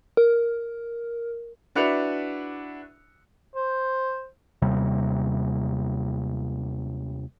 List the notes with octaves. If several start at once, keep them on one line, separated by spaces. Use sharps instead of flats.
A#4
D4 E4 F#4 B4 C#7 F7
C5
D#2 C3 G3